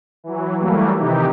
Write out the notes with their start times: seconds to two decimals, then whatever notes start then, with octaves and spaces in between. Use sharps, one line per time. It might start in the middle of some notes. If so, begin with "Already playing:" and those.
0.24 E3 F#3
0.59 E3 F#3 G3 A3 A#3
0.97 C3 D#3 E3 D#4 G4